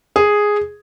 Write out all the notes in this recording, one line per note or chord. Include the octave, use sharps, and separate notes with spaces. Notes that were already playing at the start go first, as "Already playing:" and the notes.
G#4